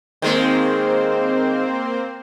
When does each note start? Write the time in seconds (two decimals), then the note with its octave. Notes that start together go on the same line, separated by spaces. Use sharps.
0.22 D#3 G#3 A#3 C4 C5